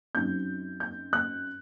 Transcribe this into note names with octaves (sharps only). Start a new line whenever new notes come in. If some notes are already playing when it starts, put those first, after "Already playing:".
F#2 F#3 C4 D#4 G6
G6
F#6